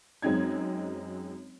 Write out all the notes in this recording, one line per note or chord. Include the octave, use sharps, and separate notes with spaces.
F#2 G#3 C4 D#4 G#6